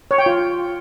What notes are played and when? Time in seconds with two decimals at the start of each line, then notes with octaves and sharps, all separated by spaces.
0.11 C#5
0.18 G5
0.26 F4